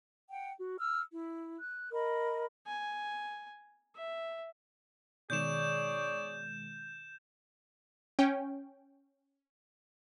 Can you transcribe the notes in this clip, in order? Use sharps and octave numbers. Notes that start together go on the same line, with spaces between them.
F#5 G5
F#4
E6 F6
E4
F#6
A#4 D#5 B5
G#5
E5
B2 D#3 G#3 G#4 C#5 D5 G6 E7
C#4 G5